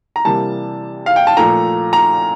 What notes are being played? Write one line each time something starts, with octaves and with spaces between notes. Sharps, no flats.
A#5
C3 E3 G3 A#3 A5
F5
G5
A5
A#2 F3 A3 A#5
A#5